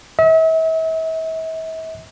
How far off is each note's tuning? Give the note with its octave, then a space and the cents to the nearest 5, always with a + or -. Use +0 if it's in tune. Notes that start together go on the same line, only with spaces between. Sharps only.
E5 -40